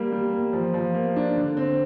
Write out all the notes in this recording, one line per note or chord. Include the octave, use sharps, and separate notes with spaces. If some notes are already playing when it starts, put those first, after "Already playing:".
Already playing: G3 A#3
G3
A#3
F3
F3
A#3
D4
D3
C4